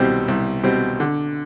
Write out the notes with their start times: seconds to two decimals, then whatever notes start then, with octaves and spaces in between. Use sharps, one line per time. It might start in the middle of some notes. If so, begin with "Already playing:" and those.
Already playing: C2 B2 G3 C4
0.28 C2
0.63 B2 G3 C4
1.00 D3